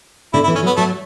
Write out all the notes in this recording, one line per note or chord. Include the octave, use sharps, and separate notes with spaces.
D3 E4
E4
E3
C#4
F#3
B3
F#3 A3